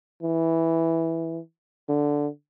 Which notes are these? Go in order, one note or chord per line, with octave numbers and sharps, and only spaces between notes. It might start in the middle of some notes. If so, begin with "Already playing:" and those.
E3
D3